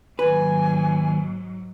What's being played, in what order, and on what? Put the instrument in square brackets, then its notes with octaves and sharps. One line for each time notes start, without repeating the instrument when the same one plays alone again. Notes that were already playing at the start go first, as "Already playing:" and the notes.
[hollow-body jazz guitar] D#2 B4 [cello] G#2 F#3 [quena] G#5